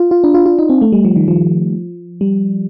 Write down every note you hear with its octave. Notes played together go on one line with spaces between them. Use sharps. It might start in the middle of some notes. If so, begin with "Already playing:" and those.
Already playing: F4
F4
D4
F4
F4
D#4
C4
A3
G3
F3
D#3
F3
G3